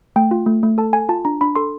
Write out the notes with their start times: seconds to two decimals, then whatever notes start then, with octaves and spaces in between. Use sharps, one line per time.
0.16 A3 G5
0.31 F4
0.46 A3
0.63 A3
0.78 A4 A5
0.93 A4 G#5
1.09 F4 A5
1.25 D4 A#5
1.41 D4 B5
1.56 A4 C6